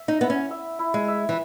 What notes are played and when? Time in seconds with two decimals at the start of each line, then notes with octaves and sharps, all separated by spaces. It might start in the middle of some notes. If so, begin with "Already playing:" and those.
Already playing: E5
0.08 D#4
0.21 B3 E4
0.30 C#4
0.51 E5
0.79 E4
0.94 G#3
1.08 E5
1.29 E3